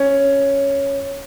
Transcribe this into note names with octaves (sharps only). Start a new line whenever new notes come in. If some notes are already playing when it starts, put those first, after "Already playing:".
Already playing: C#4